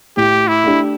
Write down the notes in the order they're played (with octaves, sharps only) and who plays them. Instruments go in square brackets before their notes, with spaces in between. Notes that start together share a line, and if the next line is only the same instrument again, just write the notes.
[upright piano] A2 [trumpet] G4
[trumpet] E4
[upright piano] A3 D4 G4